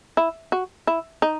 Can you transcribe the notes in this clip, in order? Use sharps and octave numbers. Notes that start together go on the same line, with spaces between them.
E4
F#4
E4
D#4